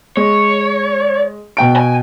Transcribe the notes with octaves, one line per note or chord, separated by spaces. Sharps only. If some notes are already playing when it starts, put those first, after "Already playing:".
G#3 C#5
B2 G5 D7
G#5